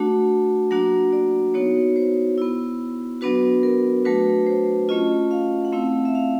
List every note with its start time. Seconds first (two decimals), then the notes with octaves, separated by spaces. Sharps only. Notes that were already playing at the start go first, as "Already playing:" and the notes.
Already playing: A3 D4 F#4 F#5
0.71 F#3 A#3 D4 F#4 F#5
1.13 D5
1.54 B3 D#4 F#4 C#5
1.96 C5
2.38 B3 E4
3.21 F#3 B3 D4 F#4 B4
3.63 A#4
4.05 F#3 A3 D4 F#4 B4
4.47 C5
4.89 A3 C#4 F4 D#5
5.31 F5
5.65 F#5
5.73 A3 C4 E4 F5
6.05 E5
6.15 F5